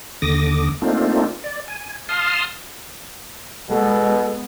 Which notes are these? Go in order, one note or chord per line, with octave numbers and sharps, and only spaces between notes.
D#2 D3 D6 D#6 A#6
A3 A#3 C4 D4 D#4 F4
D5
G#5
F5 A5 C6 D#6 F6
B2 G#3 B3 A4